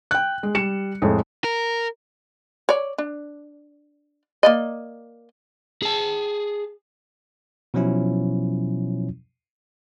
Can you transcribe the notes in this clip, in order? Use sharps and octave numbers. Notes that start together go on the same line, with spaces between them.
G5 F#6
G#3
G3 C#7 E7
F2 A2 G#3
A#4
C#5 D5
D4
A#3 D5 D#5
G#4 A5
B2 F3 F#3 C#4 E4